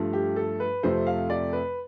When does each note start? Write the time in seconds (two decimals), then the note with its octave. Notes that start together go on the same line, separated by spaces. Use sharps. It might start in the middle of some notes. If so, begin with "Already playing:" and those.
Already playing: G2 F3 A3
0.13 G4
0.36 A4
0.60 B4
0.83 F2 C3 F3 A3 C5
1.07 F5
1.30 D5
1.53 B4